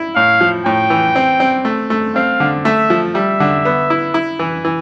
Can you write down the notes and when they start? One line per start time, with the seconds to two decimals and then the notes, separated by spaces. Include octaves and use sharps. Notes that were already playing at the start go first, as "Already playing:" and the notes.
Already playing: E4
0.15 A2 F5
0.41 F3
0.65 A2 G5
0.90 E3
1.16 C4
1.40 C4
1.65 A3
1.90 A3
2.15 C4 F5
2.40 D3
2.65 A3 E5
2.90 F3
3.15 G3 E5
3.40 D3
3.65 B3
3.90 E4
4.14 E4
4.39 E3
4.65 E3